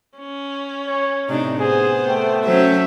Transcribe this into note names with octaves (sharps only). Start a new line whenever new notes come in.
C#4
C#5
A2 C3 D4 D#4
B3 G#4 C5
A3 G5
F#3 C#4 C5 E5